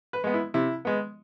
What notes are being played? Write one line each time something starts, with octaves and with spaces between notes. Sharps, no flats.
B4
G#3 B3
E4
C3 E4
G#3 B3